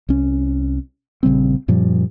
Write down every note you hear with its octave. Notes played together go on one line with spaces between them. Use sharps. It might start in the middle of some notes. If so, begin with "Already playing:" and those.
C2 C#4
A#1 C#3 G3 C4
F#2 A#2 F3 G3